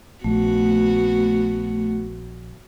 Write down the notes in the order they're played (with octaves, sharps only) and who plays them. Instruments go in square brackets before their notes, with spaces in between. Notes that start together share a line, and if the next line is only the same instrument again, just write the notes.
[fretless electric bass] A#1 [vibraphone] A3 [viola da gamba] B3 F#4